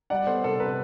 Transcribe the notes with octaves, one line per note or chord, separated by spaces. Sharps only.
G3 D5 F#5
B3 A4 C5
C3 A4
C3 B4